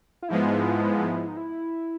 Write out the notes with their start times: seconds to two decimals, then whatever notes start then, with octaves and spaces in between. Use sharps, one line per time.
0.22 F4
0.29 G#2 F3 G#3 B3 E4
1.28 D#4
1.37 E4